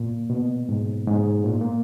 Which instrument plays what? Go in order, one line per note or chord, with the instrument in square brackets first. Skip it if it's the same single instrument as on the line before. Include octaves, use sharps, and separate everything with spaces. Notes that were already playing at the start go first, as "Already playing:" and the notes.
Already playing: [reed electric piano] A#2
B2
G#2
G#2
A#2
A#3